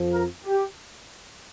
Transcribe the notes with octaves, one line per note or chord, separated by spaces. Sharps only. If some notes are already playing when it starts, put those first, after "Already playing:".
Already playing: F2 F3
A#4
G4